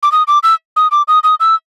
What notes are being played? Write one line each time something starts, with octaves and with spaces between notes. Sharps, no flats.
D6
D#6
D6
E6
D#6
D6
D#6
D#6
E6